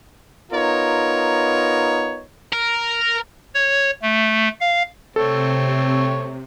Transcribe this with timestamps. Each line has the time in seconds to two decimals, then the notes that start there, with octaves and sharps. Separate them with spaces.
0.52 B3 D#4 F4 A#4 C#5
2.53 A#4
3.54 C#5
4.02 A3
4.61 F5
5.16 C3 A3 C4 A4 C#5